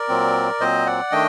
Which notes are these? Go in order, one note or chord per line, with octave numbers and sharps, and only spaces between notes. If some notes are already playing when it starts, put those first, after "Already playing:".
Already playing: A#4 D5
A#2 F#3 C4
A#2 F#3 C4 C5 D#5
D5 F#5
D#3 A3 D4 D#5 G5